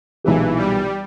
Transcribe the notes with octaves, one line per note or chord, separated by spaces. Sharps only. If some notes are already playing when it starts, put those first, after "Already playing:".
B1 A#2 E3 G#3 B3 G4
G3